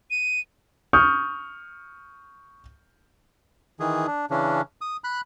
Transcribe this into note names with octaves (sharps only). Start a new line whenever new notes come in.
D#7
C#6 D#6 F6 G6
D#3 E3 G#4
D4
C#3 E3 C#4 D4
D#6
B5 F#6